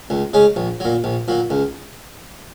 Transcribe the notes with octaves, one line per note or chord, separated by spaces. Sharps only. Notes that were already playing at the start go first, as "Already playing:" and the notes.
C#2
C#3 G#3 C#4
A#1
A#2 F#3
A#1
A#2 F#3
C#2